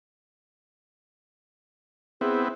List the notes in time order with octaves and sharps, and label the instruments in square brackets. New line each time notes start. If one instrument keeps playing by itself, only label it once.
[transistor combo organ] B3 C4 E4 [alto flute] G#4